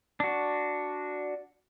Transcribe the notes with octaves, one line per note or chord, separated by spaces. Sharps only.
D4 F#4